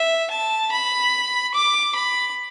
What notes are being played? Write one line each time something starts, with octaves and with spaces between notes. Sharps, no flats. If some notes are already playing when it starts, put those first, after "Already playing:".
Already playing: E5
A5
B5
D6
B5